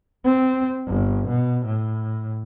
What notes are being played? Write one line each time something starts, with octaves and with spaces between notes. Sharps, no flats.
C4
G1
B2
A2